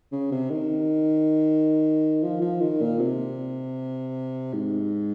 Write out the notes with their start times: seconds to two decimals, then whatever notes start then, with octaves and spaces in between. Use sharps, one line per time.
0.12 C#3
0.32 C3
0.50 D#3
2.24 F3
2.42 F3
2.61 D#3
2.81 A#2
2.99 C3
4.53 G#2